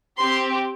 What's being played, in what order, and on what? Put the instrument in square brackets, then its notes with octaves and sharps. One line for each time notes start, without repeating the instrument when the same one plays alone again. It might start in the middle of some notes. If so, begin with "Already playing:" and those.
[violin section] C4 G4 C6